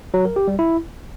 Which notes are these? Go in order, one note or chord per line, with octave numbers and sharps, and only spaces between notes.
F#3
A#4
G4
G3
E4